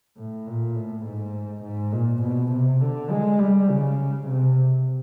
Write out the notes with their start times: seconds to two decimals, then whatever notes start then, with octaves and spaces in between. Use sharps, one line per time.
0.17 A2
0.47 A#2
0.75 A2
1.05 G#2
1.64 G#2
1.93 A#2
2.22 B2
2.52 C3
2.81 D3
3.11 G#3
3.40 G3
3.69 C#3
4.28 C3